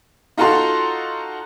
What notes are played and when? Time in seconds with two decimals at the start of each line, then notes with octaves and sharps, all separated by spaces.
0.37 D#4 F4 F#4 A4 A#5 C6